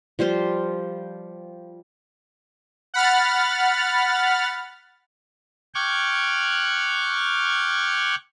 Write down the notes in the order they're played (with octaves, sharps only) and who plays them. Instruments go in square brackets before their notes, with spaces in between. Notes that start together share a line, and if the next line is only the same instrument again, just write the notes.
[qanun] F3 G3 F4 C5
[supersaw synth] F#5 B5 F6 A6
[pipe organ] G5 C#6 D6 F6 F#6 G#6